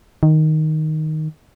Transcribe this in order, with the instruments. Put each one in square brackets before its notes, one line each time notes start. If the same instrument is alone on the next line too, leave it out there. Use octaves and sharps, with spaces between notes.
[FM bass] D#3